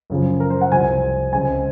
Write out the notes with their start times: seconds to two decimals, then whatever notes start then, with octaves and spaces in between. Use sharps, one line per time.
0.10 F#2 C#3 F3
0.40 A#4
0.50 C5
0.61 F#5
0.71 C2 C3 F3 C4 G#5
1.32 C#2 C#3 G#3 C4 G#5